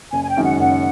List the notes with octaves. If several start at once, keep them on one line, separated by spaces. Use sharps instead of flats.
F#1 G#5
G#5
G5
F#2 D#3 G#3 C#4
F#5
F#1 F#5